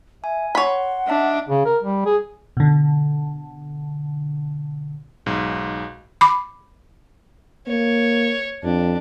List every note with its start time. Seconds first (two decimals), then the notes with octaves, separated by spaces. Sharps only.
0.24 E5 G#5
0.55 C#5 F#5 B5 C6
1.08 D4 D#5 E5 A5
1.49 C#3
1.66 A#4
1.83 G3
2.06 G#4
2.57 B2 D3
5.26 B1 G#2
6.21 B5 D6
7.67 A#3 C#5
8.64 F2 D4